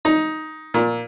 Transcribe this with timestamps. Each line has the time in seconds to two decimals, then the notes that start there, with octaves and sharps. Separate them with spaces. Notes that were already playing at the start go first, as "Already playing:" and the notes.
0.05 D#4
0.74 A#2